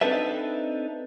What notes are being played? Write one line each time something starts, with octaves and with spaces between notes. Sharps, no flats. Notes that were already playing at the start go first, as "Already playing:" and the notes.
C4 D4 D#4 A4 B4 E5